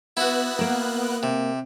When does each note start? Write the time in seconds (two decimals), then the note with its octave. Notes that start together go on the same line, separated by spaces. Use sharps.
0.17 B3 E4 F#4 F#6
0.59 A#3 A#4
1.23 C3